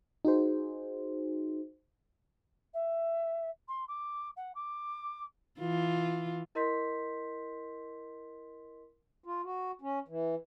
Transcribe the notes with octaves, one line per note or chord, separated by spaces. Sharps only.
D#4 F#4 G#4 C5
E5
C6
D6
F#5
D6
E3 F4
E4 A#4 D#5 C6 G6 B6
F4
F#4
C#4
E3